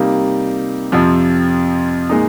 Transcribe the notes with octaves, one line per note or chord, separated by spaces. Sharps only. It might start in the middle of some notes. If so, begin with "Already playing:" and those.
Already playing: C3 G3 A#3 D#4
F2 C3 F3
A#2 G#3 D#4